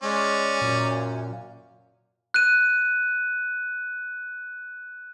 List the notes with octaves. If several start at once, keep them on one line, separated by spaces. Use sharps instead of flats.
G#3 C#4 D5
F#2 A#2
F#6 D#7